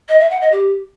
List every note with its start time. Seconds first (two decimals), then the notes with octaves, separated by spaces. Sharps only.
0.09 D#5
0.20 E5
0.30 F#5
0.41 D#5
0.52 G4